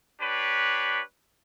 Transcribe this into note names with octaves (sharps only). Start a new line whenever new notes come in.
D4 G4 B4 C#5